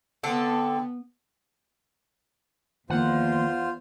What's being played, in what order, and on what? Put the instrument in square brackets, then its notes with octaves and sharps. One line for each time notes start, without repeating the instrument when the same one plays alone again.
[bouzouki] D3 C4 A4 [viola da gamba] B3
[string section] E2 [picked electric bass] D#3 F3 A#3 [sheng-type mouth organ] F4 C5 [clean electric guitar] F#5